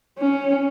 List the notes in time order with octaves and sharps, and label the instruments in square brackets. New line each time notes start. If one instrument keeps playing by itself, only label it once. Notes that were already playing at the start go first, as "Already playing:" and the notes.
[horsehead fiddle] C#4